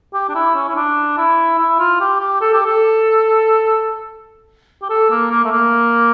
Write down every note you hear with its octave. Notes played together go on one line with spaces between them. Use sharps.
G4
D4
E4
C#4
E4
D4
E4
E4
F4
G4
G4
A4
G4
A4
G4
A4
A#3
A#3
A3
A#3